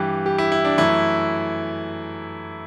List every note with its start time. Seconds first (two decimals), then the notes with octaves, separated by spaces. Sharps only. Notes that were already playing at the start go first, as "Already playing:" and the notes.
Already playing: G2 E3 G3 G4
0.26 G4
0.38 E4
0.52 E4
0.65 D4
0.78 F#2 E3 A3 E4